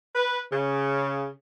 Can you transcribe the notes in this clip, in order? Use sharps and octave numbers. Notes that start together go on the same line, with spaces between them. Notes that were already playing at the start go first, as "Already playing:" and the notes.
B4
C#3